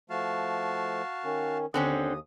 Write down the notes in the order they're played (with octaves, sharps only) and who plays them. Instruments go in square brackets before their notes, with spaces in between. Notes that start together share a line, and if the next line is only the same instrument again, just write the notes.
[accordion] F3 A3 [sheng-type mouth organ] F#4 F5 A5
[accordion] D#3 C#4
[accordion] D#2 D#6 [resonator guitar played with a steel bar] D3 C4 C#4